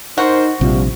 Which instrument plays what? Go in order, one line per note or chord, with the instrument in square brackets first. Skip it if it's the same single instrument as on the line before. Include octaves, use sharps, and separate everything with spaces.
[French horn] D#4 [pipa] F#4 [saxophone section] A#4 C5
[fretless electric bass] A#1 C3 [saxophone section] F3 [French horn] G3